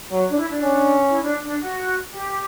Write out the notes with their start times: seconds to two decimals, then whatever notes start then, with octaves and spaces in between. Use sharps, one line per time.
0.11 F#3
0.29 D4
0.36 E4
0.49 D4
0.61 C#4
1.10 E4
1.22 D4
1.43 D4
1.60 F#4
2.09 G4